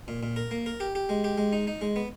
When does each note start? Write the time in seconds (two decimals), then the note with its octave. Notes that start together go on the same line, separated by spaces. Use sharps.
0.08 A#2
0.23 A#2
0.36 A#4
0.51 A#3
0.66 A#4
0.80 G4
0.95 G4
1.09 G#3
1.24 G4
1.38 G#3
1.53 D#4
1.67 D#4
1.81 G#3
1.96 B3